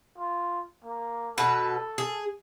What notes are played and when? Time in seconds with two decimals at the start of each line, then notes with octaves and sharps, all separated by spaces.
0.18 F4
0.85 A#3
1.38 B2 A4 B4
1.98 G#4